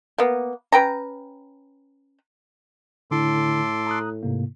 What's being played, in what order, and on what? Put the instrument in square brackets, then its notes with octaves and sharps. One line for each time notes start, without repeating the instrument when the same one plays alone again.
[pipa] A#3 B3
C#4 B4 G5 A#5
[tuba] A2 [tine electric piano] D3 E4 [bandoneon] A4 C6 D6
[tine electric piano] A#5 D#6 F#6
G#2 C3 A#3